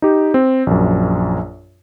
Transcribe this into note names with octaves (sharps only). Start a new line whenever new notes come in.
D#4 G4
C4
A#1 F#2